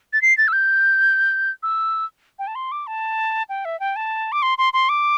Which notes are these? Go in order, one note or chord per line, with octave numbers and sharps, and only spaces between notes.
A6
C7
A6
E6
G6
E6
G5
A5
C6
D6
A5
G5
E5
G5
A5
D6
C6
C6
C6
D6